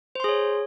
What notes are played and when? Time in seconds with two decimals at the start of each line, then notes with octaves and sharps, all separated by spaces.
0.15 C5
0.20 C6
0.24 G#4
0.29 C#5